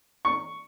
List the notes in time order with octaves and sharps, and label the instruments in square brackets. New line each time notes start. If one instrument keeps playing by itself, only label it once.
[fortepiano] C#6